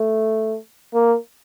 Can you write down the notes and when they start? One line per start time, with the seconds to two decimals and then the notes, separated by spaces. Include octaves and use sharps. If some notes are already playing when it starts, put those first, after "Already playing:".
Already playing: A3
0.94 A#3